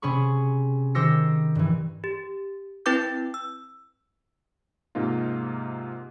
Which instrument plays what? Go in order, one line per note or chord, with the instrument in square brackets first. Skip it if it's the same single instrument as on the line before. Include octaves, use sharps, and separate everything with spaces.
[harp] C3 C#4 G#4 B5 C#6
D#3 G4 C5 E6 A#6 C#7
G2 E3
[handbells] G4
C4 E4 B4 G5 D6 G6
E6
[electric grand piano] G#2 C3 A#3 D#4 F4